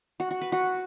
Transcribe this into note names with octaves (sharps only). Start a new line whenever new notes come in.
F#4
F#4
B4
F#4